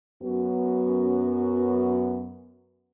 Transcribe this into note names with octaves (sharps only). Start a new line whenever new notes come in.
F#2 B3 F#4